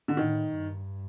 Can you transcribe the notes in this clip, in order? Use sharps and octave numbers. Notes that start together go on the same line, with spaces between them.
D3
A2 D#3
G2